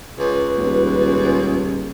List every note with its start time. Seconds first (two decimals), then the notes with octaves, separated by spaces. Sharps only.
0.18 C#2 B4
0.57 D#1